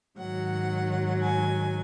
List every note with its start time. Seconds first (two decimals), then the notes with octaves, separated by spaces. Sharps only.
0.19 G#2 D#3 F#3 F#5
1.22 G#5